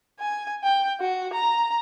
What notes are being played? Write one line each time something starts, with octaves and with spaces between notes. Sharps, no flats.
G#5
G5
F#4
A#5